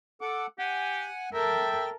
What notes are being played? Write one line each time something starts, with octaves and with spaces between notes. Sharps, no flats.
A4 F#5 D6
G4 F#5 G#5
A4 A#4 E5 G5